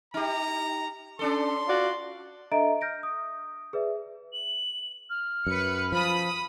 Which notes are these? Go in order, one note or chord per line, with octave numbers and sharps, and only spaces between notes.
D#4 G4 A#5
C#4 D4 A4 C6
F4 F#4 D5
D4 A4 D#5 E5 A#5 D7
F6 G6 A#6 D7
D#6
G#4 B4 D5 E5
F#7
F6
F#2 B4 C#7
F3 B5 D#6